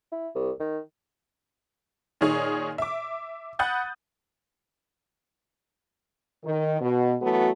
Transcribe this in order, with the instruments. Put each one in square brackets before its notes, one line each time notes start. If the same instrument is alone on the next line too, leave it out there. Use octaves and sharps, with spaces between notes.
[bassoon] E4
C2
D#3
[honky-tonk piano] A#2 D#3 D#4 G#4 C#5
E5 D6
F#5 B5 D#6 F#6 G6 A6
[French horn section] D#3
B2
E3 F#3 A3 B3 F#4